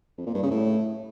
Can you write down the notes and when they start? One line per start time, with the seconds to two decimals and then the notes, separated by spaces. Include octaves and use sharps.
0.18 F2
0.26 A#2
0.34 G2
0.43 C#3
0.51 A2